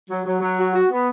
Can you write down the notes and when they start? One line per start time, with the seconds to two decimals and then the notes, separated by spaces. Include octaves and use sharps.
0.09 F#3
0.25 F#3
0.41 F#3
0.58 F#4
0.74 F#4
0.90 B3